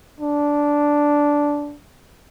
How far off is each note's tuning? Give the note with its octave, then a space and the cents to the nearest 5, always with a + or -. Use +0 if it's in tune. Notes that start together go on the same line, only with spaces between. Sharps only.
D4 -10